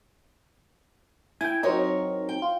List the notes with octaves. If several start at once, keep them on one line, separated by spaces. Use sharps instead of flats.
E4 G5 G#5
F#3 C4 D#4 A#4 C#5
G5
F4